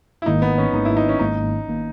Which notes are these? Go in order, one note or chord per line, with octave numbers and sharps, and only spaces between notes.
E4
G#1 G#2 D#3 A#3 D#4
B3
C#4
G#1 G#2 D#3 A#3 D#4
E4
D#4
C#4
G#1 G#2 D#3 A#3 D#4
G#1 D#3 A#3